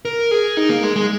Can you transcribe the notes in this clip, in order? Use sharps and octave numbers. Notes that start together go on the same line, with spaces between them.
A#4
G#4
D#4
A#3
G#3
G#3